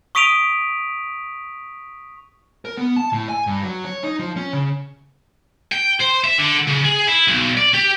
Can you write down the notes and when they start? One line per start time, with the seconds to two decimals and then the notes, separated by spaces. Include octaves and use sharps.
0.15 C#6 D#6 B6 D7 D#7 F7
2.65 A#4
2.77 B3
2.96 A5
3.13 A2
3.29 G#5
3.47 G2
3.63 F#3
3.85 C#5
4.03 D#4
4.19 F3
4.36 C#4
4.53 C#3
5.72 G5
6.01 C5
6.24 E5
6.38 D3
6.67 C#3
6.84 G#4
7.07 E4
7.27 B1
7.57 D5
7.74 G4